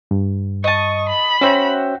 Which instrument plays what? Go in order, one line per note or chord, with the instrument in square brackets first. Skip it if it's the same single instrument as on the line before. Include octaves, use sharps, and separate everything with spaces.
[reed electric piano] G2
[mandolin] D#5 A5 [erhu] C#6
[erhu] B5
[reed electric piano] C#4 C5 C#5 [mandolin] F#4 E5 G5